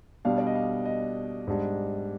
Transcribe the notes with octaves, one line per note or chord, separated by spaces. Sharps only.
B2 G3 D4 F5
D5
D#5
F5
D#5
G#2 G3 D4